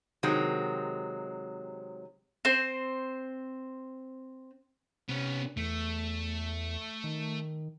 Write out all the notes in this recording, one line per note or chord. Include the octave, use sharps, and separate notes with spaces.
C3 D#3 F#3 G#3 C4
C4 C5
C3 B3 C#4
E2 A3
D#3